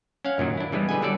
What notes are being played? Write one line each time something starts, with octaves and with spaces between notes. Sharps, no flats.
C#4 C#5 F5 F#5
F#2 A#2 D#3 F#3
D4 E4
E3 G3 G#3 B3
D3 B4 D#5 G#5
D3 F#3 G3 A4 D5